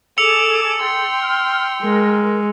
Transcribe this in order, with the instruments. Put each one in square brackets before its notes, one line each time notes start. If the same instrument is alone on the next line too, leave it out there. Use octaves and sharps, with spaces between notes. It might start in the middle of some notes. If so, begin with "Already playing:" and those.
[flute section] G#4 A4 [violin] D6 E7 [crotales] E6 C#7 F7
[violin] G5 C6
[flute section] F6
[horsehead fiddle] G#3 [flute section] A#4